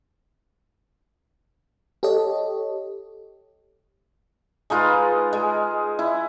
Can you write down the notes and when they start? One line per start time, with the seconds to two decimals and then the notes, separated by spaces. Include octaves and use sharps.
2.03 G4 A4 C#5 D#5
4.70 G#3 D#4 F4 B4
5.33 G#3
5.99 E4